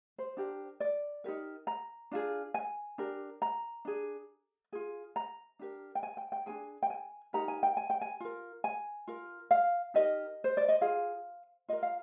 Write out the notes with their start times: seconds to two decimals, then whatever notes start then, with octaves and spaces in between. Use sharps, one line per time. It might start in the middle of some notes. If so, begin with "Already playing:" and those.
0.18 C5
0.37 D4 G4 A#4
0.80 D5
1.24 D#4 G4 A#4
1.67 A#5
2.11 D4 F4 G#4
2.54 G#5
2.98 D4 G4 A#4
3.42 A#5
3.85 D4 G#4
4.73 F4 G#4
5.16 A#5
5.59 D4 G4 A#4
5.95 G5
6.03 G#5
6.17 G5
6.32 G5
6.46 D4 F4 G#4 G#5
6.83 G5
6.90 G#5
7.33 D#4 G4 A#4 A#5
7.48 G#5
7.63 G5
7.77 G#5
7.90 G5
8.01 G#5
8.20 F4 A#4
8.64 G#5
9.07 F4 A#4
9.51 F5
9.94 D#4 G4 A#4 D#5
10.44 C5
10.57 D5
10.68 D#5
10.81 F4 G#4 F5
11.68 F4 A#4 D#5
11.83 F5